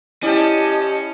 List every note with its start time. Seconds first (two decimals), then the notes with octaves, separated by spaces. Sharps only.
0.23 C#4 E4 G4 D5 D#5 A5